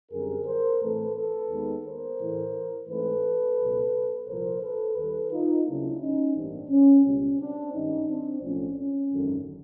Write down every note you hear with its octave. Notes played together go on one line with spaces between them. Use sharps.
F#2 D3 G3 C4 G#4 A#4
A#4 C5
A2 E3 A3 C4 A4 B4
A4 B4
D#2 D#3 G#3 B3
A#4 C5
A2 E3 A3
G#2 E3 A3 C4 A4 B4
C#2 B2 F#3
C2 A#2 F3 A#4 C5
A4 B4
D#2 D#3 G3 A4 B4
D#4 F4
D2 C#3 F#3 A#3 D4 E4
C#4 D#4
A1 G2 E3 G3 A#3 C4 D4
C#4
C#2 B2 G3 C#4
C4 D4
G#1 G2 D#3 C#4 D#4
C4 D4
B1 A2 F3 A3 C4 C#4
C#4
G#1 F#2 D3 F#3